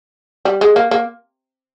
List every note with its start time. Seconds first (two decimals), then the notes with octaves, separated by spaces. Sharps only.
0.45 G3
0.61 G#3
0.76 A#3
0.91 A#3